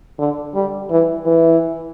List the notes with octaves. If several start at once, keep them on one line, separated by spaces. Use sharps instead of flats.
D3
G3
E3
E3